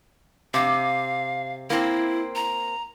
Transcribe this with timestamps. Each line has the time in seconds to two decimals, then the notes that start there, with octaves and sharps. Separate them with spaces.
0.54 C3 F5
1.70 A#3 C4 E4
2.35 A#5